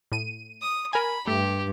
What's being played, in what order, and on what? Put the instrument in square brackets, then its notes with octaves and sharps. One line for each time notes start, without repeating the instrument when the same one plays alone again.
[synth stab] A2 D#7
[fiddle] D#6
[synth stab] A#4 G#5 [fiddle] B5
[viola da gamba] G2 [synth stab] A3 [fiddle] G4